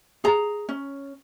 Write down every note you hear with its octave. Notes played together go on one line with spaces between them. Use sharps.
G#4 A#5
C#4